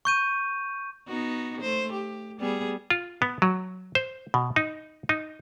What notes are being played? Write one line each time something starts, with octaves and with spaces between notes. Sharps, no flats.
C#6 G6 D#7
B3 D#4 F#4
A3 C5
G4
G3 B3 G#4
F4
B3
F#3
C5
B2
D#4
D#4